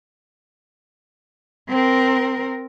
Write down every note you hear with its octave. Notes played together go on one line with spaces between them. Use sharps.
C4 A#4